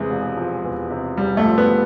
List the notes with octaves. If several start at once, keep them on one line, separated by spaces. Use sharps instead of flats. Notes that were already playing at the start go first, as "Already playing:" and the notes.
Already playing: E2 C3 G#3
E1
F3
E2
C3
E1 G3
A3
F3
B3